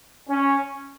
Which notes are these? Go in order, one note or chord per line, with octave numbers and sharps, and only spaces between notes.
C#4